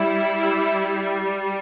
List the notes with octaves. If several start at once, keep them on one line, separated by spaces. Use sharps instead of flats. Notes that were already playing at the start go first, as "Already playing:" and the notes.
Already playing: G3 E4